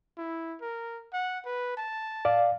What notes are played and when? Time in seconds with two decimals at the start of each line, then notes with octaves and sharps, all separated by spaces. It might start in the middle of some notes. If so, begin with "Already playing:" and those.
0.18 E4
0.61 A#4
1.13 F#5
1.46 B4
1.77 A5
2.25 D5 F5